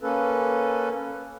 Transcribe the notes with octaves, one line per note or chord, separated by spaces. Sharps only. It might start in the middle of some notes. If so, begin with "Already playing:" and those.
A#3 C#4 A4 B4